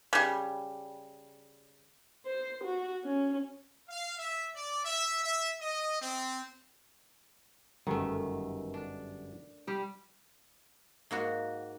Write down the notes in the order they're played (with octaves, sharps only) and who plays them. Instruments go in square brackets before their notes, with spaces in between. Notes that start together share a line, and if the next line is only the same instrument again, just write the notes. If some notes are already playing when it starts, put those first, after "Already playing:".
[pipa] C#3 G3
[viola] C5
F#4
C#4
[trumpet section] F5
E5
D5
E5
E5
D#5
C4
[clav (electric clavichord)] G1 F#2 [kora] D#3 A3
[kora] D4
G3 G4
[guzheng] G#2 A#3 F#4